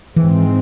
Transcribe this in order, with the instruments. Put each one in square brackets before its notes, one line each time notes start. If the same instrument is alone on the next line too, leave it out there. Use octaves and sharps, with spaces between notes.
[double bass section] G#2 G#3 C4 [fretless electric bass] E3